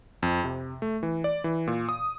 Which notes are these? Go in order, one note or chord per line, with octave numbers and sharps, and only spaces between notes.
F2
C3
A3
E3
D5
E3
A#2
D#6